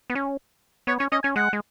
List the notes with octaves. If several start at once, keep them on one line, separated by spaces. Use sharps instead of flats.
B3
C#4
B3 C#5
C#4 C#5
C#4 D#5
C#4 G#5
G#3 F#5
G#3